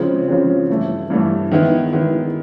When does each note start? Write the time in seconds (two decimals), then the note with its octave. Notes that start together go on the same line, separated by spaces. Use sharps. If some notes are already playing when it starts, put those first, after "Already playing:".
Already playing: C#3 F3 G#3 C4
0.28 C#3 F3 G#3 C4
0.69 G2 E3 A3
1.10 G2 E3 A3
1.51 D#3 G#3 B3 E4
1.93 D#3 G#3 B3 E4